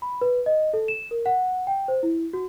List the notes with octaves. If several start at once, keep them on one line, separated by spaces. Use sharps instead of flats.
B5
B4
D#5
A4
E7
A#4
F#5
G5
C5
E4
F#4